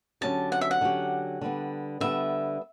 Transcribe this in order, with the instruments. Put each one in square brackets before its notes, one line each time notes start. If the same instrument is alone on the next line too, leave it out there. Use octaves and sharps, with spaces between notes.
[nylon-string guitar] D3 F#3 C#4 G4 [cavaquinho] A5
[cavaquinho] F#5
E5
F#5
[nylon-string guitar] D3 F#3 C#4 G4
D3 G3 B3
[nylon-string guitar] D3 G3 B3 [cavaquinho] E5